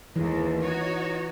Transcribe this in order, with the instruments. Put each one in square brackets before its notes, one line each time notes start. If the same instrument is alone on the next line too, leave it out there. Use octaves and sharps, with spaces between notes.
[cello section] D#2 G#3 [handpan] E3
[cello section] D#4 F#4 C#5